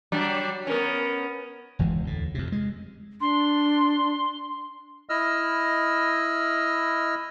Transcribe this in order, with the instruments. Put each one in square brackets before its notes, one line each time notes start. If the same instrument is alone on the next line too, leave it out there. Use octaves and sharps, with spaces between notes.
[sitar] F#3 G3 D4
[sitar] B3 C#4 [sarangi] A#4
[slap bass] F#1 E2 E3 G#3
D2 A2
F2 C3
G#3
[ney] D4 [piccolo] C6
[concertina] E4 D#5 E6 F6